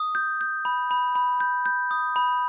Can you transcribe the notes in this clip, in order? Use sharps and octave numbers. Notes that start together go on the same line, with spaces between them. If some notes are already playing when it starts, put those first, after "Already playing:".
Already playing: D#6
G6
G6
B5
B5
B5
G6
G6
D#6
B5